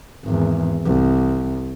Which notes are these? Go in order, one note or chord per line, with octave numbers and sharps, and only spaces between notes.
G#1 E2
C2